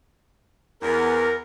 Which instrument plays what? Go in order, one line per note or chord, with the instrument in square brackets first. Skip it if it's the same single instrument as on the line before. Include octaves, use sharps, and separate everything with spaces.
[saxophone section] E2 [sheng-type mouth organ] A#4